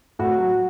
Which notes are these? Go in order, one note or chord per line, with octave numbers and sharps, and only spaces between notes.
A2 F#4
F#3